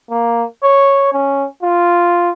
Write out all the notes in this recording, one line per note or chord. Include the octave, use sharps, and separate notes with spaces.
A#3
C#5
C#4
F4